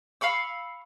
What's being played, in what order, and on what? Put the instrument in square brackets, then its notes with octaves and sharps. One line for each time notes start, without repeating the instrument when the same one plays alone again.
[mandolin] F5 B5 C#6 E6